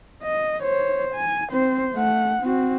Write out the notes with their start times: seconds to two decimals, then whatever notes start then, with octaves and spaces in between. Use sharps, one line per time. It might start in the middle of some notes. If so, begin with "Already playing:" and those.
0.23 D#5
0.62 C5 C#5
1.15 G#5
1.51 C4 C5
1.95 A3 F#5
2.42 C4 F#4